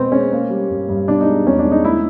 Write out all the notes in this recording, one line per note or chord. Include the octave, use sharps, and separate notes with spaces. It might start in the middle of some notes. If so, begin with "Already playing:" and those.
Already playing: B2 G#3 B3 C4
G#3 C#4
A#3
G3
G2
G2
B2 D4
D#4
G#3
E2 C#4
D4
G#3
D#4
A3 E4